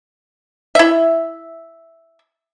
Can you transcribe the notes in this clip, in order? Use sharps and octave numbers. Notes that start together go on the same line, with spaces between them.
E4 E5